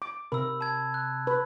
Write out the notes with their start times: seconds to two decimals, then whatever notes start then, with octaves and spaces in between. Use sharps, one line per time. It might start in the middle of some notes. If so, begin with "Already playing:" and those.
0.02 D6
0.32 C3 A#4 B5 E6
0.61 A5 G#6
0.94 F#6
1.27 B4